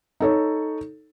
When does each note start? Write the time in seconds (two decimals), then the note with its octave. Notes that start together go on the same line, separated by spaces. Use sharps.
0.20 D#4 A4 C#5